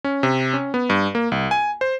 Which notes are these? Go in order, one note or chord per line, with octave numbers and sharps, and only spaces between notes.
C#4
C3
C#4
B3
G2
A#3
C2
G#5
C5